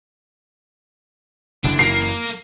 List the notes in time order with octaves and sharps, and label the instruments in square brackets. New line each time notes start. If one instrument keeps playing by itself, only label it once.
[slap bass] F#1 C#3 E3 [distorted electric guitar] D4
[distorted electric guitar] A#3 [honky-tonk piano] C7